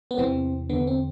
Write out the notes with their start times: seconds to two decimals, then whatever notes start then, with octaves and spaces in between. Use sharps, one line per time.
0.11 B3
0.18 E2 C3 E3 C4
0.70 E2 D3 B3
0.87 C4